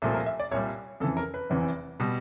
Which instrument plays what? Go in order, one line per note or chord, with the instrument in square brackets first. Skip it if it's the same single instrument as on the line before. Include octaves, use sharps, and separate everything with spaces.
[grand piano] C2 A#2 F3 A3
A#4
E5
D5
C2 A#2 G3 C#5
F2 C#3 E3 A4
A#4
B4
F1 E2 C3 E3
B2 G3